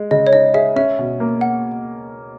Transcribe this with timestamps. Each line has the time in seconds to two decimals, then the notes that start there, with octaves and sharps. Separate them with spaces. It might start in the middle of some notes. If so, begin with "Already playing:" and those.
Already playing: G#3
0.11 C#3 D#5
0.27 C#5
0.33 D#4 D#5
0.54 G#4 E5
0.76 C#4 E5
0.99 B2
1.20 A#3
1.41 F#5